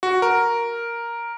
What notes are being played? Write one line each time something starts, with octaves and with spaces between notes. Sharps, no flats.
F#4
A#4